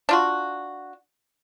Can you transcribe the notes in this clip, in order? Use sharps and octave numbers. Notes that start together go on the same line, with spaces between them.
D4 F4 F#4